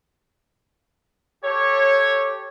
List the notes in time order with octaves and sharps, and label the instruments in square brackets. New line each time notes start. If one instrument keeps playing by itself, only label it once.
[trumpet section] G4 A4 C#5